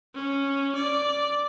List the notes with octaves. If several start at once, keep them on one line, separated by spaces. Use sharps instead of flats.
C#4
D5